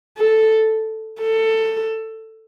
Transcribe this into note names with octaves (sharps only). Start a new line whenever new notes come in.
A4
A4